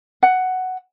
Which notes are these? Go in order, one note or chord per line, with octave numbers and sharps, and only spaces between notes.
F#5